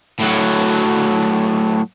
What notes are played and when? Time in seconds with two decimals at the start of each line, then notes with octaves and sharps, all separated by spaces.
0.20 A2 F#3